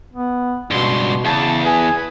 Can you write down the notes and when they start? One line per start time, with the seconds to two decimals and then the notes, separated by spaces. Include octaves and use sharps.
0.14 B3
0.71 C#2 G2 B2 C6
1.25 E2 C#3 A5
1.65 G#4 B4 G#5